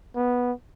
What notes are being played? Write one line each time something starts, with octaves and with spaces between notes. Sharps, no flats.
B3